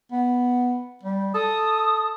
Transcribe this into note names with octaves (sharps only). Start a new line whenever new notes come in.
B3
G3
A4 D#6